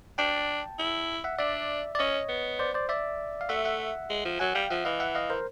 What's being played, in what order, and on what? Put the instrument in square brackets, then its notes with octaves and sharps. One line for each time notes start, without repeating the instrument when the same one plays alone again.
[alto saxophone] D4 [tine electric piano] G5 A5
[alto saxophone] E4
[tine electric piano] E5 F#5
[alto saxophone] D4 [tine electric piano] D5 E5
[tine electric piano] D5
[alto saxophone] C#4 [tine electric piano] C#5 D#5
[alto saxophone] B3
[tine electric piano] C5 D5
C5 D5
D5 E5
F5
[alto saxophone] A3 [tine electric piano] E5 F#5
[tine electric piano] E5 F#5
[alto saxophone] G#3
F3
[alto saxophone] F#3 [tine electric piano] F#5 G#5
[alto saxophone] G3 [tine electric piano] F5 G5
[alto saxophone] F3 [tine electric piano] E5 F#5
[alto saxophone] E3 [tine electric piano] D#5 F5
[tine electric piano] E5 F#5
D#5 F5
A#4 C5